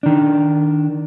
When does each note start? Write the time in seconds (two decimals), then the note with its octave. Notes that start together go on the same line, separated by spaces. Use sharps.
0.03 D#3 D4